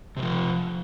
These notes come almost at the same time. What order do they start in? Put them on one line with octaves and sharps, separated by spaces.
C3 G3 F3